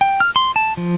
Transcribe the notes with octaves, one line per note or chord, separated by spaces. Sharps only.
G5
F6
C6
A5
F3